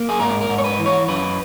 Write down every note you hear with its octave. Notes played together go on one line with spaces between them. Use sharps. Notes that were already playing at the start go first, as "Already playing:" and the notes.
Already playing: A#3
G#4
G#2 A#4
A#4
G#2
C#5
B4
E3
C#5
F#2 B4